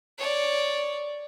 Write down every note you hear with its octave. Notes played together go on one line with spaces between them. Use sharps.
C#5 D5